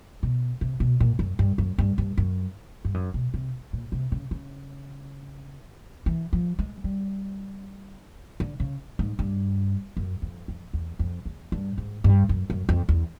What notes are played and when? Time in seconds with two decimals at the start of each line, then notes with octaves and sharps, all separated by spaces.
0.23 B2
0.61 C3
0.80 B2
1.00 A#2
1.19 F#2
1.39 G2
1.58 F#2
1.78 G2
1.98 G2
2.18 F#2
2.85 G2
2.94 F#2
3.14 B2
3.34 C3
3.73 A#2
3.92 C3
4.12 C#3
4.31 C#3
6.06 E3
6.33 F3
6.59 G#3
6.84 G3
8.40 D3
8.60 C#3
8.99 G#2
9.19 G2
9.97 F#2
10.22 F2
10.48 F2
10.73 E2
10.99 F2
11.25 E2
11.52 G2
11.78 G#2
12.04 G2
12.29 F#2
12.50 F#2
12.69 F2
12.89 E2